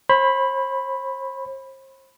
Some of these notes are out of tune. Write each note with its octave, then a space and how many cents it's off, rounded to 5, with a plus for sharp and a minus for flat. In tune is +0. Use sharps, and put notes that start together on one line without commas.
C5 +40 B5 +0